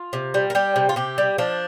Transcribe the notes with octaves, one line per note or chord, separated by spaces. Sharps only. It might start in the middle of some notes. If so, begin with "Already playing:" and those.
Already playing: F4
C3
G3
A#4
G3 G4
C3
F4
C3 G4
G3
F3 D4